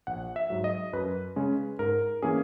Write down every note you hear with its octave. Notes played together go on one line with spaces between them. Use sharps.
A#1 F#5
E5
G#2 F#3
D#5
F#2 B4
C#3 G#3 C#4
G#2 A#4
E3 A#3 C#4 G#4